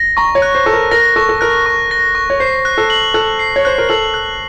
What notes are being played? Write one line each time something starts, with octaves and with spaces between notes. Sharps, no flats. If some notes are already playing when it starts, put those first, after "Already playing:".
Already playing: A#6
A#5 C#6
C#5
F#6
C5
A4 C#6
A#4
A#4 A#6
A4 C#6
A4
A#4 F#6
C#6
A#6
C#6
C#5
C5 C7
F#6
A4
F#7
A4 F#6
C7
C#5
C5 F#6
A#4
A4 F#7
F#6